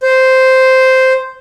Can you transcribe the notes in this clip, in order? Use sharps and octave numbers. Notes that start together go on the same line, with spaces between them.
C5